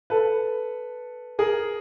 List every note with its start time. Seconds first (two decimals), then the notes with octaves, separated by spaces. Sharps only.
0.10 A4 B4
1.39 G#4 A#4